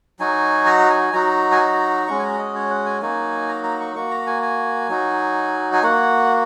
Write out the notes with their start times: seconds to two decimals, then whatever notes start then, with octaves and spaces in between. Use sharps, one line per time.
0.20 F#3 D#4 F#4 G#5
0.66 A#5
0.90 G#5
1.13 F#3 D#4 F#4 A#5
1.52 G#5
1.60 A#5
2.07 G#3 C#4 F#4 C#6
2.19 G#5
2.23 A#5
2.38 D#5
2.55 C#5
2.70 F#5
2.86 G#5
3.01 F#3 A#3 D#4 F#4 G#5
3.49 A#5
3.64 A#5
3.80 C#6
3.95 A#3 F#4 C#6
4.11 A#5
4.27 G#5
4.42 G#5
4.89 F#3 D#4 F#4
5.73 G#5
5.83 A#3 F#4 F#5